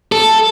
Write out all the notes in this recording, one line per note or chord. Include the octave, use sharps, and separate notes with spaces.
A4